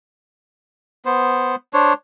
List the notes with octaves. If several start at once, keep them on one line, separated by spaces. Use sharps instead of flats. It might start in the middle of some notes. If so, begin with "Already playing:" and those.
B3 C5
D4 C5 C#5